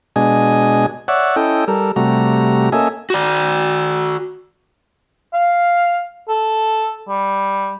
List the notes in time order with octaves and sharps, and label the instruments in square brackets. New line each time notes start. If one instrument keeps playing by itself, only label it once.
[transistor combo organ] B2 G#3 D4 D#5 G#5
C#5 D5 E5 F#5
C#4 E4 A4 D#5 G5
G3 A4 A#4
C3 G3 A3 F#4 A#5
A#3 C#4 A4 D#5 E5 G#5
[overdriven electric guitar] F#4 D5
[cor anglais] F5
A4
G3